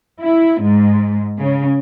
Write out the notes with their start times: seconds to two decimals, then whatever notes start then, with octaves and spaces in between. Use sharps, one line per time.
0.22 E4
0.62 G#2
1.39 C#3